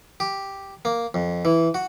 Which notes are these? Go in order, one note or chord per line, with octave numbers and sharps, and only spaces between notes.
G4
A#3
F2
E3
F#4